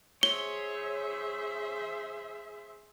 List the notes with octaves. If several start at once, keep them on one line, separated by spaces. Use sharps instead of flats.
G#4 C5 C#5 E5 G7